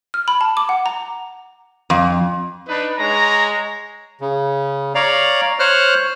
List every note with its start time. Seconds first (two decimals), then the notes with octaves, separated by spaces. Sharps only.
0.14 F6
0.28 B5
0.41 A5
0.57 D6
0.69 F#5
0.86 A#5
1.90 F2
2.68 D4 D#4 B4
2.97 G#3 C#5 A#5
4.21 C#3
4.95 C#5 D5 F5 A#5
5.59 C5 C#5 F6 F#6